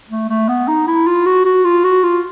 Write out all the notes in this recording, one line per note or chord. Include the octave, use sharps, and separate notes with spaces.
A3
A3
B3
D#4
E4
F4
F#4
F#4
F4
F#4
F4